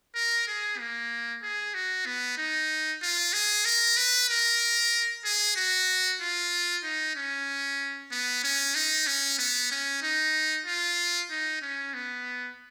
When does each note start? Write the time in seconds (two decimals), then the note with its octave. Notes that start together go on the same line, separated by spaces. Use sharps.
0.15 A#4
0.48 G#4
0.79 A#3
1.42 G#4
1.74 F#4
2.06 B3
2.38 D#4
3.02 F4
3.33 G#4
3.65 A#4
3.97 B4
4.30 A#4
5.25 G#4
5.56 F#4
6.21 F4
6.83 D#4
7.16 C#4
8.11 B3
8.44 C#4
8.75 D#4
9.07 C#4
9.39 B3
9.71 C#4
10.02 D#4
10.66 F4
11.31 D#4
11.62 C#4
11.94 B3